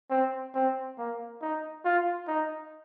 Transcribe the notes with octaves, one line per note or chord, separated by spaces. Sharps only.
C4
C4
A#3
D#4
F4
D#4